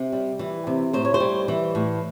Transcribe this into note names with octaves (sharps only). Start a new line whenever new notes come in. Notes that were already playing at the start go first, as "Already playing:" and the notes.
Already playing: C3
G3
E3
C3
A2 C5
C#5
C5
G3
E3
A2